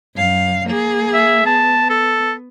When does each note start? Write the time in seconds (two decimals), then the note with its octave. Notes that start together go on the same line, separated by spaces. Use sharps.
0.15 F#2 F5
0.67 A#3 G#4
1.14 E5
1.46 B3 A5
1.90 A4